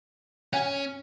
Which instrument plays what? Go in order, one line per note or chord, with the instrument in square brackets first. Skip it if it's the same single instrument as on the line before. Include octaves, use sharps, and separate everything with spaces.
[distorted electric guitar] C#4 [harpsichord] F#5 G#5